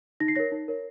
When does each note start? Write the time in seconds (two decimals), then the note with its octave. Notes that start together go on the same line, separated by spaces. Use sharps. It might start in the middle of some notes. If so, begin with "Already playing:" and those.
0.20 D#4 A#6
0.28 C7
0.35 A#4 C#5 A#6
0.52 D#4
0.68 A#4 C#5